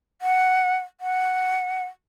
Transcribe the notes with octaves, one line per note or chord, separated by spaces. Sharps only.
F#5
F#5